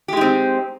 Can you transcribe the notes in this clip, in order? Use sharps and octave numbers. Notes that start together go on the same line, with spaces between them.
G#3 C4 D#4 G4